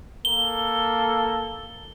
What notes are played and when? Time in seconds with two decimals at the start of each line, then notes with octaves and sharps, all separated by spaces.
0.25 A#3 A4 G7